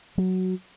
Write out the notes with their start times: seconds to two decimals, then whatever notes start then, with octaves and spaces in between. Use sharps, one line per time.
0.18 F#3